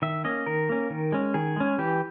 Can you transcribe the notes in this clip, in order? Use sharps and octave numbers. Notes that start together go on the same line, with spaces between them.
D#3 E5
A#3 C#4 D#5
D#3 A#4
A#3 C#4
D#3
G#3 C#4
D#3 G#4
G#3 C#4
E3 G4